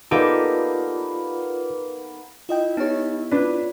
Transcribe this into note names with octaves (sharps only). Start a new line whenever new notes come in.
A#3 B3 D#4 F4 G4 A4 D5
E4 F4 D#5 G5
B3 D#4 G4 C#5
D4 F4 B4 D5